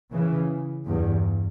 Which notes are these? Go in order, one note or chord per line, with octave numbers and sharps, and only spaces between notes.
C#3 E3
E2 G2